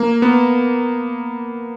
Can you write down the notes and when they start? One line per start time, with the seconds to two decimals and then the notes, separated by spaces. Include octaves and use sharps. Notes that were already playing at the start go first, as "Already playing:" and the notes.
Already playing: A#3
0.22 B3